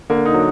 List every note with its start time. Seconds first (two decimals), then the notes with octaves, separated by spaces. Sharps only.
0.10 D3 A#3
0.26 D#4
0.34 F#3